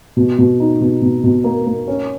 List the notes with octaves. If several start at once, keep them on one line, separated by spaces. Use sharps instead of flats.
B2
B2
D#4
B2
B2
B2
A#3
A#3
C#4